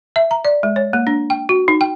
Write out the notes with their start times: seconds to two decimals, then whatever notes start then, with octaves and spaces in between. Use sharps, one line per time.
0.16 E5
0.31 A#5
0.45 D5
0.63 G#3
0.76 C#5
0.93 A#3
1.07 D4
1.30 G5
1.49 F#4
1.68 D#4
1.81 G5